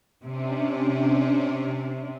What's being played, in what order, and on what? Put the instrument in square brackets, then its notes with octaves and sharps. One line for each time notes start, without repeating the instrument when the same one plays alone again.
[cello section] C3 [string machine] C#4 D4